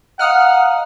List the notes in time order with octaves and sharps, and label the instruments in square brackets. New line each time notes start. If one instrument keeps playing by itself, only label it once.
[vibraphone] D#5 F5 A#5 [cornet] F#5 [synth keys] D#6 F6 F#6